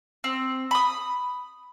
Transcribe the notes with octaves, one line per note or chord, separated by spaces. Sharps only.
C4
B5 D#6